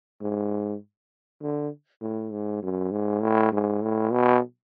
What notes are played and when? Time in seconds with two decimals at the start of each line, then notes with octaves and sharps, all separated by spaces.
0.21 G#2
1.42 D3
2.01 A2
2.32 G#2
2.62 F#2
2.91 G#2
3.22 A2
3.52 G#2
3.82 A2
4.12 B2